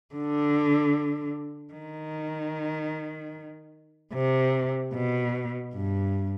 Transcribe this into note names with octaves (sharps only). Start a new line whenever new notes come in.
D3
D#3
C3
B2
G2